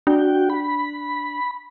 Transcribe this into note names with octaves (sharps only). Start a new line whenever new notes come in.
D4 F#4 G5
B5